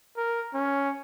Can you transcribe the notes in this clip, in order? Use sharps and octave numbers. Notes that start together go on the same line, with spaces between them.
A#4
C#4